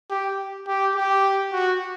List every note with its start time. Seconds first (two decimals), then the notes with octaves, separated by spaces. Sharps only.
0.10 G4
0.67 G4
0.95 G4
1.52 F#4